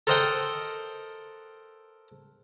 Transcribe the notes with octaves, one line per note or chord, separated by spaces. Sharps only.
A4 A#4 C5 D#5 F#5 G5